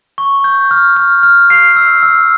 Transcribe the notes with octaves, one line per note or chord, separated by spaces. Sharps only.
C#6
G6
F6
F6
F6
C7
E6
E6